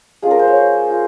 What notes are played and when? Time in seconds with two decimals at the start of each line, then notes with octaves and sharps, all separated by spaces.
0.22 G#3 C#4 F4 G#4
0.31 A#4
0.39 C5
0.47 C#5
0.56 C5
0.90 F4